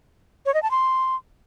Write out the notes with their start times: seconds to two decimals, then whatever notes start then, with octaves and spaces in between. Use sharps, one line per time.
0.46 C#5
0.54 D#5
0.63 A5
0.71 C6